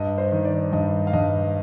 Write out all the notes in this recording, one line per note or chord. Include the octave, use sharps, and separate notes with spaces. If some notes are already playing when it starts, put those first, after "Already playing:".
Already playing: G2 D#5
C5
D#3
D5
G2 D#5
F5
G2 D#5